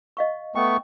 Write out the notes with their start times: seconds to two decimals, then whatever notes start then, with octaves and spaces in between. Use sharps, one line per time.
0.17 D#5 F5 C#6
0.55 A3 B3 G5 C#6